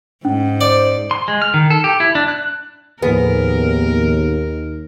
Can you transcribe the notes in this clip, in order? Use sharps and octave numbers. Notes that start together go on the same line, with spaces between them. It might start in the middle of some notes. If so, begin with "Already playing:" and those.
G#2 C#4
C5 D5
C6
G#3
F6
D#3
A4
G4
E4
D4
F#6
D#2 A2 F3 B3 G#4 A#4